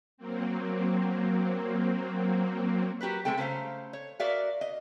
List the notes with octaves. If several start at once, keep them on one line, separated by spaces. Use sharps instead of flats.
F#3 A#3 C4
F#4 G4 A#4 B4
G#3 A3 C4 A4 G5
C#3 A3 C5 F5 A#5
C#5
F#4 A#4 D5 E5 F5
D#5